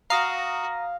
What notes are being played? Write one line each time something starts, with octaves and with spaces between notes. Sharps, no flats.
F#4 F5 A#5 D#6 A#6